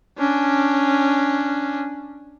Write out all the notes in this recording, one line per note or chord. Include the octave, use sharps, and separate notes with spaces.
C#4 D4